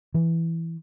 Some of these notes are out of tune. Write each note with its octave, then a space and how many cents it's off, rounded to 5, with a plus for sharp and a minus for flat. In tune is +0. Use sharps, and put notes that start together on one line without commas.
E3 +5